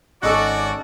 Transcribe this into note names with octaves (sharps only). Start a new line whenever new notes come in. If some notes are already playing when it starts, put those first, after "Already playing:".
G#1 C#4 D#4 F#4 A4 D5 C#6